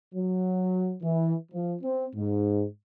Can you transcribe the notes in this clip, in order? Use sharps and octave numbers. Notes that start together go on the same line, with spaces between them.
F#3
E3
F3
C4
G#2